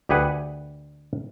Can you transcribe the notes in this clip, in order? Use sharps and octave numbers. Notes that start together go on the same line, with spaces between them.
D2 G4 G#4 B4 F#5